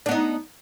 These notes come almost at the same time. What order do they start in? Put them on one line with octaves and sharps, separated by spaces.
D4 B3 D#4